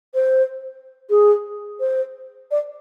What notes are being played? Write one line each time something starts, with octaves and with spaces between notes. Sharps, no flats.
C5
G#4
C5
D5